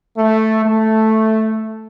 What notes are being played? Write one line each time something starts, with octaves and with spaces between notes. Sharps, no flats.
A3
A3